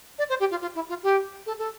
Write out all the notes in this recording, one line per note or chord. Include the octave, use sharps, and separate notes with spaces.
D5
C5
G4
F4
F4
E4
F4
G4
A4
A4